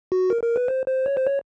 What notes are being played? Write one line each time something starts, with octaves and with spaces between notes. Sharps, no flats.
F#4
A#4
A#4
B4
C5
C5
C#5
C5
C#5